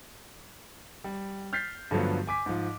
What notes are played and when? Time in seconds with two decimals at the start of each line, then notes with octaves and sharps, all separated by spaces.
1.04 G3
1.53 F6 G6 A6 B6 C7
1.91 G2 D3 F3 F#3 A3 B3
2.27 G#5 D6 B6
2.46 G#2 F3